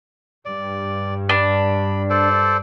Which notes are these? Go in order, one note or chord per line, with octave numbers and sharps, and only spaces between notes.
G2 D5
D4 B5
A4 C5 D5